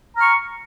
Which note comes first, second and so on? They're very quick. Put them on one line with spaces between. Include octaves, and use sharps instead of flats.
A#5 F6 C#6